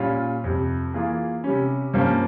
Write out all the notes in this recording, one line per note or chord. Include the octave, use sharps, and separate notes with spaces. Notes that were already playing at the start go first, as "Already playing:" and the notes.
Already playing: A#2 G3 C#4 F4
F2 C3 G3
E3 A#3 F4 G#4
C3 G3 C#4
G2 F3 A#3 C#4